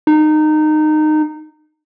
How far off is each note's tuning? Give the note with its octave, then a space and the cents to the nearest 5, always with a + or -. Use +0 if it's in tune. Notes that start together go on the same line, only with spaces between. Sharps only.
D#4 -20